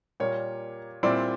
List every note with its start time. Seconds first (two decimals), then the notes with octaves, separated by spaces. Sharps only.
0.20 A#2 G3 A#3 C#5
1.03 A#2 G3 C4 E4 D5